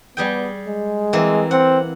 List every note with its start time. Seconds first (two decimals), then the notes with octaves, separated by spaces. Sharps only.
0.17 G3 B3 G#4 G5
0.68 G#3
1.13 E3 A#3 C4
1.51 C4 F#5